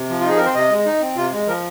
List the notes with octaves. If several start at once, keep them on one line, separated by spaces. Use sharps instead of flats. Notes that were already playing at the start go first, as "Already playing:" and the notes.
Already playing: C3
F3
F4
D#4 G#4
C4 A#4
C5
C3 D#5
G#3
D#4
C4
C3 F4
G#3
F3 A#4